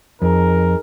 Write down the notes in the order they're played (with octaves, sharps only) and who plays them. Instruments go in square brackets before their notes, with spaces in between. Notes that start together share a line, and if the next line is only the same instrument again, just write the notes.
[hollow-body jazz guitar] F2 [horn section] D#4 G#4 A#4